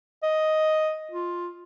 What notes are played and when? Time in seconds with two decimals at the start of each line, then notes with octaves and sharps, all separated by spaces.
0.23 D#5
1.11 F4